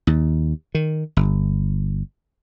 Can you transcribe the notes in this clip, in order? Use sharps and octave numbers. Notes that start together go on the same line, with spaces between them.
D#2
D#3
G1